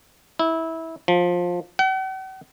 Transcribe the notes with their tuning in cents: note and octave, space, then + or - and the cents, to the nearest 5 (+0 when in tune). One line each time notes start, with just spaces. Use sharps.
E4 -20
F3 +15
F#5 +45